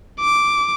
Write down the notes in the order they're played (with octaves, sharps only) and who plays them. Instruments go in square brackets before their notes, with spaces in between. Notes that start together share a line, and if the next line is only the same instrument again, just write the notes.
[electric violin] D6